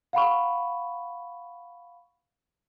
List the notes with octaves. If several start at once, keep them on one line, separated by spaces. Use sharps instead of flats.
F5 F#5 B5 C#6